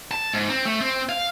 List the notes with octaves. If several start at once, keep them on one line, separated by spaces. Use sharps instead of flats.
A5
G#2
C4
A3
C4
F5